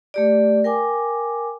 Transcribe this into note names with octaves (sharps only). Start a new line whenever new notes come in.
A3 G4 D5
A#4 G5 G#5 D6